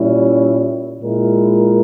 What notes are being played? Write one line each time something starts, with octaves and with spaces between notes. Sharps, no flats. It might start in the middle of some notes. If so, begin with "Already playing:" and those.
Already playing: A#2 G3 C#4 E4
A#2 G#3 E4 A#4